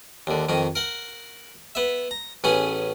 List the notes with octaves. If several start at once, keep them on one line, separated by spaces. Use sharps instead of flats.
D#2 D3
F2 D#3 D#4
A#4 F#5
B3 E5
A#5
A1 B3 C#4 G#4